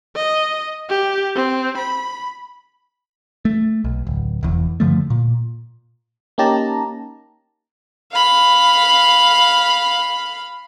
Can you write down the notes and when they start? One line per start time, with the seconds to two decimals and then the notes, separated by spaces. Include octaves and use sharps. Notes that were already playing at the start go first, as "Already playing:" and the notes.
0.16 D#5
0.89 G4
1.35 C4
1.78 B5
3.45 A3
3.84 B1
4.07 D1
4.43 F1 E2
4.80 G2 D3 F3 A3
5.10 A#2
6.38 A#3 C#4 D#4 G4 A5 A#5
8.12 F5 B5